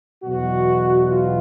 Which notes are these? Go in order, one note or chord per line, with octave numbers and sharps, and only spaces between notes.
E2 B2 F#3 F#4
F4